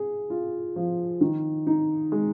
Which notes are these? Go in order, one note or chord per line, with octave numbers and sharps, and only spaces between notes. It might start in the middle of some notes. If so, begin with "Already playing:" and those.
Already playing: G#4
F4
F3
D#3
D#4
G#3